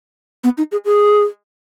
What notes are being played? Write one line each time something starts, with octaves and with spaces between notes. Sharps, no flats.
B3
D#4
G#4
G#4